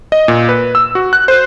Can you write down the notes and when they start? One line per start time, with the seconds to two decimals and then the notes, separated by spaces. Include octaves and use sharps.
0.12 D#5
0.28 A#2
0.49 B4
0.75 E6
0.95 F#4
1.13 F#6
1.28 C5